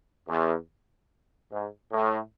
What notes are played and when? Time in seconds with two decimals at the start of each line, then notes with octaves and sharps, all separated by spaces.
0.28 E2
1.51 G#2
1.92 A2